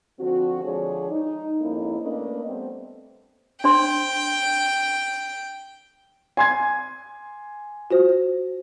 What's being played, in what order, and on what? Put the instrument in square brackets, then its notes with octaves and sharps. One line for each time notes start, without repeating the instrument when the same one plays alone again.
[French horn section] D3 F3 C4 F#4
D3 F3 G#3 D4 G#4 C#5
D#4
F2 G#2 A#3 C#4 D#4 E4
A3 A#3 C#4 D4 B4 D#5
G3 A3 B3 C4
[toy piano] D4 C5 C6 [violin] G5
[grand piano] G#5 C6 G#6
[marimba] F4 F#4 C5